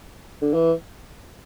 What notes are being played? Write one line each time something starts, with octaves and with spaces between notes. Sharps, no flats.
D3
E3